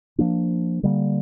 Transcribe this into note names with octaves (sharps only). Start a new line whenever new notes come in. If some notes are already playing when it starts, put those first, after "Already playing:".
F3 A#3 D4
D3 G3 A#3